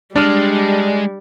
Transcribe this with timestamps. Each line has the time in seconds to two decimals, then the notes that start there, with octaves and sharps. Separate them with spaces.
0.16 G3 G#3 D4 D5 F6